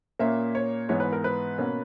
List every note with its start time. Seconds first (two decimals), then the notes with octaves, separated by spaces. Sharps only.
0.19 A#2 A#3 C#4 E5
0.55 C#5
0.89 G#2 E3 B3 C#5
1.00 B4
1.12 A#4
1.24 B4
1.58 B2 A#3 C#4